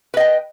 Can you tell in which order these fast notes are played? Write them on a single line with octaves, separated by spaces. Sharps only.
B4 D#5 G5